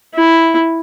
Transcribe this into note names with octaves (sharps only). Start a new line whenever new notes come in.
E4